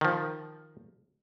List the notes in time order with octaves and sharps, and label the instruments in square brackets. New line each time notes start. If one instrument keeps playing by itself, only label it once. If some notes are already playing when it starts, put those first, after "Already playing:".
[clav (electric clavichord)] D#3 F3